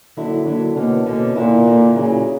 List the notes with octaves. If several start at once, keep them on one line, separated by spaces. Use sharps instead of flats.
D3 F#3 A#3 E4
D3 F#3 A#3 E4
B2 D3 A#3 C#4
B2 D3 A#3 C#4
A#2 D3 A#3 E4
D3 A#3 E4
A#2 C#3 F#3 A#3 E4